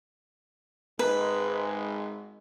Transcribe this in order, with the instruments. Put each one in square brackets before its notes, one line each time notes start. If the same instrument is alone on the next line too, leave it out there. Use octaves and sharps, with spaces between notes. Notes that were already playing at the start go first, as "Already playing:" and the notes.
[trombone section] G#1 G#2 G#3 [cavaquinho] B4